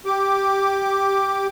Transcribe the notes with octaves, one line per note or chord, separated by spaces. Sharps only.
G4 D6